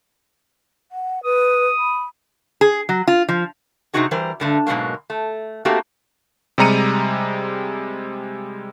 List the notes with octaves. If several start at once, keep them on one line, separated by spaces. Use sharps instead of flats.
F#5
B4 D#6
B5
G#4
F#3
F4
F3
C3 D#3 C4 D#4 F#4 G#4
E3 G3 A#4 C5
G2 D3 A3
G#2 B2 F#3 G#3 A#3
A3
A3 A#3 C4 F#4 G4
C3 G3 G#3 A#5 C#7 D#7